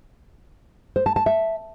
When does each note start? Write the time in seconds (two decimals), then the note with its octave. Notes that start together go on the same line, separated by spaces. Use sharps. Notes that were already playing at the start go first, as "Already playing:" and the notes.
0.96 C5
1.06 A5
1.16 A5
1.26 E5